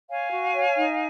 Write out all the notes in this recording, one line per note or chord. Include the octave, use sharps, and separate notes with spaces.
C#5 F5 G#5
F#4
C#5
D#4